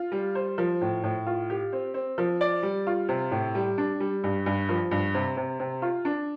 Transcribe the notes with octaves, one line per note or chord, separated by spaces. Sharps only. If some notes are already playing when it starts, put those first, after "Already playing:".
Already playing: F4
G3
C5
F3
A2
A2
F4
G4
C4
C4
F3
D5
G3
F4
C3
A2
G3
D4
G3
G2
G2
F3
G2
C3
C3
C3
F4
D4